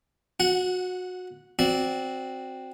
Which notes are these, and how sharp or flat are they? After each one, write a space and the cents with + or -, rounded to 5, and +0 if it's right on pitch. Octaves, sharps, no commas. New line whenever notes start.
F#4 -20 F#5 +0
C4 +0 F#4 -10 D5 -15